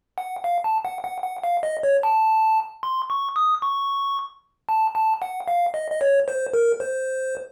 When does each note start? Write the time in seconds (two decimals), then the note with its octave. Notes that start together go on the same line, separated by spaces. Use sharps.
0.18 F#5
0.44 F5
0.64 A5
0.85 F#5
1.04 F#5
1.23 F#5
1.44 F5
1.63 D#5
1.83 C#5
2.03 A5
2.83 C6
3.10 C#6
3.36 D#6
3.62 C#6
4.69 A5
4.95 A5
5.22 F#5
5.48 F5
5.74 D#5
5.92 D#5
6.01 C#5
6.28 C5
6.54 A#4
6.80 C5